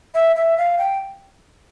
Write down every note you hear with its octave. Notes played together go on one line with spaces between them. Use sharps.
E5
E5
F5
G5